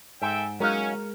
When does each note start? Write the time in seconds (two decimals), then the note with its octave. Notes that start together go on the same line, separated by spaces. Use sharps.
0.22 G#2 A4 E5 G5 G#5
0.60 F#3 G#3 C#4 D#4 A#4 F5